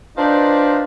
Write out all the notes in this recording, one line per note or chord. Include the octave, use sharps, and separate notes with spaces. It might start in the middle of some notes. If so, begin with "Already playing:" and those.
D4 D#4 F4 B4 C5 D5